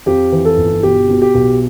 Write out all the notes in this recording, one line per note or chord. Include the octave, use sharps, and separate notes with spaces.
F2 G4
E3
A4
G1
B2 G4
B2
G4
B1